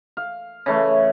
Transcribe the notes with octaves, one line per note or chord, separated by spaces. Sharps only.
F5
C#3 E3 A3